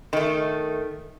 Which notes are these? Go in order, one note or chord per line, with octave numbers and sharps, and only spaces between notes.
D#3 A3